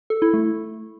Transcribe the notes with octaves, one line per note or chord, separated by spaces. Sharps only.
A4
E4
A3